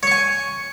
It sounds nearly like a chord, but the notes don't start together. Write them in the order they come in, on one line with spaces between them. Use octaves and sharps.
C#5 C#6 G#5